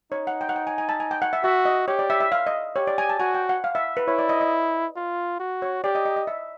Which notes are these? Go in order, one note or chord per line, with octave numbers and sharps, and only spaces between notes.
D#4 C#5
F#5
G5
F#5
G5
G#5
G#5
A5
G#5
G5
F#5
E5
F#4 E5
D#5
G4 C#5
D5
E5
E5
F5
D#5
G4 C#5
D5
G#5
A5
F#4 G#5
G5
F#5
F5
E5
B4
E4 C#5
D5
D#5
D#5
F4
F#4
C#5
G4 D5
D#5
D#5
D#5
E5